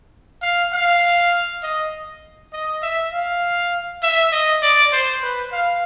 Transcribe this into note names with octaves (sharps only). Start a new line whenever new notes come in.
F5
F5
D#5
D#5
E5
F5
E5
D#5
D5
C5
B4
F5